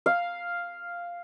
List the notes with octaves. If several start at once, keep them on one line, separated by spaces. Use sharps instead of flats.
F5